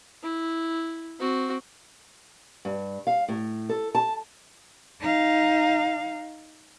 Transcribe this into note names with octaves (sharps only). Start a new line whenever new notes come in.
E4
C4 F#4
G2
F5
A2
A4
A5
D#4 F5